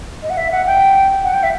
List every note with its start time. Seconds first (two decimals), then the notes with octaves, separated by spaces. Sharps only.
0.23 D#5
0.30 F#5
0.37 E5
0.52 F#5
0.67 G5
1.24 F#5
1.34 G5
1.43 E5